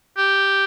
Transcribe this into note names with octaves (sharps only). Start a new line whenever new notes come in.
G4